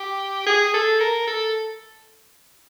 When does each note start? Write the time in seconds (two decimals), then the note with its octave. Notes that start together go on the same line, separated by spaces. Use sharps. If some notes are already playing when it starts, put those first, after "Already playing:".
Already playing: G4
0.47 G#4
0.74 A4
1.01 A#4
1.27 A4